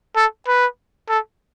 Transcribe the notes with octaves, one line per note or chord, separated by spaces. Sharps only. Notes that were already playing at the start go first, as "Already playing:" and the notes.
A4
B4
A4